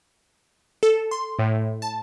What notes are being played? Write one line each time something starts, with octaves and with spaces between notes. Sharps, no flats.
A4
C6
A2
A5